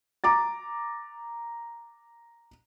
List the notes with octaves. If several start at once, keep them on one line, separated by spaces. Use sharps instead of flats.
A#5 D6 A6